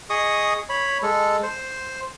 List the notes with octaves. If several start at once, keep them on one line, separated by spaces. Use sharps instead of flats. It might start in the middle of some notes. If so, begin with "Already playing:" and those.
G#4 D#5 C#6 D#6
C#5 B5
G#3 A4
C5